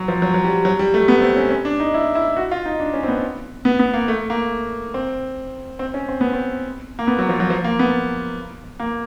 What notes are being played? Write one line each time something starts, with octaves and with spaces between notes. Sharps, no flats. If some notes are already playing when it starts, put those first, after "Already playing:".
Already playing: F#3
F3
F#3
F#3
G3
F#3
G3
A3
B3
C4
C#4
C#4
D4
D#4
E4
E4
F#4
F4
D#4
D4
C#4
C4
B3
B3
B3
A#3
A3
A#3
C4
C4
C#4
C4
B3
C4
A#3
B3
F#3
F3
F#3
F3
A#3
B3
A#3